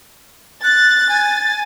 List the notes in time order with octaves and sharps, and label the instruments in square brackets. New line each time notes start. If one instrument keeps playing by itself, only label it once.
[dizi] F#6 [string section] A6
[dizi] G#5